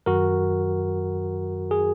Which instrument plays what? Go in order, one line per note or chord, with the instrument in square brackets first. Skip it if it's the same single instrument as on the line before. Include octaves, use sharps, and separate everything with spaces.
[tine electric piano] F#2 D#3 F#3 F#4 A#4
G#4